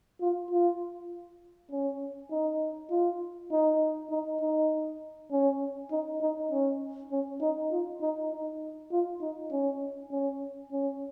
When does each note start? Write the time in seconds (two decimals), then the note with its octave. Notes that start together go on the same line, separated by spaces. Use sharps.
0.21 F4
0.51 F4
1.71 C#4
2.31 D#4
2.91 F4
3.51 D#4
4.10 D#4
4.41 D#4
5.32 C#4
5.91 D#4
6.21 D#4
6.51 C#4
7.11 C#4
7.41 D#4
7.71 F4
8.01 D#4
8.31 D#4
8.92 F4
9.21 D#4
9.51 C#4
10.11 C#4
10.72 C#4